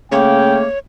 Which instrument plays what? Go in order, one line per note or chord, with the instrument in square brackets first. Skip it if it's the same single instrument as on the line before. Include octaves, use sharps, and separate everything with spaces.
[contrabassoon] C#3 [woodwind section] A3 A#3 [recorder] C#5 [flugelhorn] G5